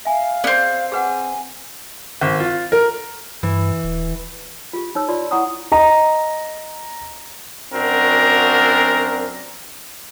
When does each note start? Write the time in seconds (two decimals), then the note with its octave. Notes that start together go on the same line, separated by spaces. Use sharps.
0.05 E5 F5 G#5
0.44 B3 C4 G#4 B4 D5
0.92 G#4 B4 F#5 G#5
2.21 G#1
2.40 F4
2.72 A#4
3.43 G2 E3
3.83 D#1
4.73 F4 G4
4.95 D#4 C#5 E6
5.08 F4 D5 C6
5.31 E4 C#5 F#5 A#5 C#6 D#6
5.72 D#5 A#5
7.73 F#2 C4 D4 F#4 A#4